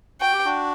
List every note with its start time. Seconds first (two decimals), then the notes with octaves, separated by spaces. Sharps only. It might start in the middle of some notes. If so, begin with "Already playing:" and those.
0.20 F#4 G5
0.33 G4
0.45 D4 F#4